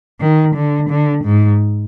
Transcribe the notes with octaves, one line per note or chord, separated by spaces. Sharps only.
D#3
D3
D3
G#2